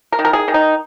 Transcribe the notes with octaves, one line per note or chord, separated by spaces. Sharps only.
A#4
D#3
A#4
G#4
D#3
D#4